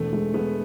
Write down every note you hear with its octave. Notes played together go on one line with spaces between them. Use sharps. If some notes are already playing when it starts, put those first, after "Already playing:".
Already playing: E1 A3
G#3
G#3 B3